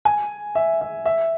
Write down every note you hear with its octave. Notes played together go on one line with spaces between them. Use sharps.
G#5
E5
E5
E5